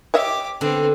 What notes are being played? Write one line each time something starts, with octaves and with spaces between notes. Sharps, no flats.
G4 C#5 D#5 E5 D6
D3 B3 C4